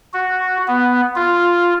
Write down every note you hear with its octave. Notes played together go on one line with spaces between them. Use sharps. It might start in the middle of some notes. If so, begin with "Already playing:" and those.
F#4
B3
F4